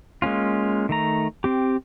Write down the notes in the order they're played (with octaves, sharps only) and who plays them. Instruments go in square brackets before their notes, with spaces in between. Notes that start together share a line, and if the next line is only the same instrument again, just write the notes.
[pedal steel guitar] G#3 A#3 C#4 F4
D#3 A3 A#5
C4 G4